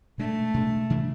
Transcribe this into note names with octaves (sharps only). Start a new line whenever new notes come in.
B2 G#3 A3 D4
B2 G#3 D4
C3 E3 G#3 D4